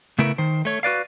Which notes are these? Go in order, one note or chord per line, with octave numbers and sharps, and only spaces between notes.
C#3 A3 B3 E4 A#4
D#3 C5
A3 C#5
F#4 B4 D5 F5